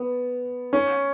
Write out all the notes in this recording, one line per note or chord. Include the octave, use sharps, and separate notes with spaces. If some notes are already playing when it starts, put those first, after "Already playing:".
Already playing: B3
C#4